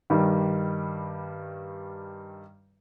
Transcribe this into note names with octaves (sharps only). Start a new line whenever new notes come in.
G2 D#3 G3